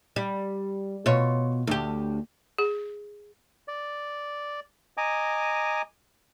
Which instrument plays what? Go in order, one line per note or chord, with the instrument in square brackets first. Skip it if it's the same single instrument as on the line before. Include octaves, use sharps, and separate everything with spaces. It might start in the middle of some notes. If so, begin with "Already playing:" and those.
[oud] G3
B2 F4 C#5
D2 G4
[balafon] G#4
[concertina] D5
D#5 G#5 A#5 D6